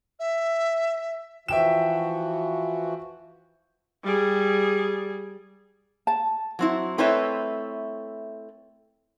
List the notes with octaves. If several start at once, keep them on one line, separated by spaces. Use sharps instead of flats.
E5
E3 F3 F#4 E5 G5 E7
G3 G#4
A5
F#3 C4 E4
A3 C4 E4 B4 C#5 E5